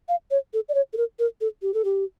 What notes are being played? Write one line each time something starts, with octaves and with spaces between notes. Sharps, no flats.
F5
C#5
A4
D5
C#5
A4
A#4
A#4
A4
G4
A4
G4